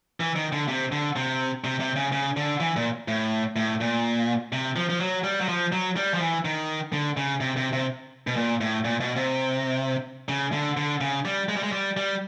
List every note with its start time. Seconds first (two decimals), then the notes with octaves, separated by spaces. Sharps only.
0.20 E3
0.36 D#3
0.52 D3
0.68 C3
0.92 D3
1.16 C3
1.64 C3
1.80 C3
1.96 C#3
2.12 C#3
2.37 D3
2.60 E3
2.76 A#2
3.08 A2
3.56 A2
3.81 A#2
4.52 C3
4.76 F3
4.89 F3
5.00 F#3
5.24 G3
5.41 F#3
5.49 F3
5.72 F#3
5.96 G3
6.14 F3
6.20 E3
6.45 D#3
6.92 D3
7.17 C#3
7.40 C3
7.57 C3
7.73 C3
8.27 B2
8.36 A#2
8.61 A2
8.85 A#2
9.00 B2
9.16 C3
10.29 C#3
10.52 D3
10.77 D3
11.01 C#3
11.25 G3
11.49 G#3
11.56 G3
11.63 G#3
11.72 G3
11.97 G3